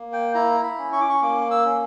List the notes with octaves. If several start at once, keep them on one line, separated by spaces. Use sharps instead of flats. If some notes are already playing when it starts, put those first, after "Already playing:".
Already playing: A#3
G5
E4 A#5
B5
C#4
C#6
D6
C#6
A#3 D6
E6
C#4